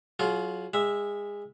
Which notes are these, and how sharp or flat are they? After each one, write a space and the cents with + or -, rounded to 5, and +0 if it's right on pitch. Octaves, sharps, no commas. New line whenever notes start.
F#3 -5 F4 +0 G#4 +40
G#3 -25 E5 +0